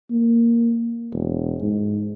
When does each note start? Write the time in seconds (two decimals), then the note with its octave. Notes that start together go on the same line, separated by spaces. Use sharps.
0.11 A#3
1.13 E1
1.62 G#2